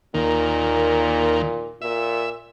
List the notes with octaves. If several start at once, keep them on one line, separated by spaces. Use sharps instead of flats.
D#2 A#2 D#3 A#3
A#2 E5